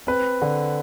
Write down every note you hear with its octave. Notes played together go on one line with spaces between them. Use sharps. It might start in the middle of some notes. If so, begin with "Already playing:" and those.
C4 B4
D3